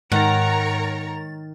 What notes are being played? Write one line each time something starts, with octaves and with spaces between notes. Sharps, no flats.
G#2 D#3 A#4 C#5 F#5 A#5 A6